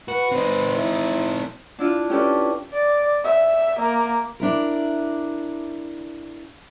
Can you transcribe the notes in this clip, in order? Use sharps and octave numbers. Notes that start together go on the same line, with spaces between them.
F#4 B4
C4 D#4
E4
D4 E4 F4
C#4 G4 A4 B4 D5
D5
E5
A#3
D4 E4 A#4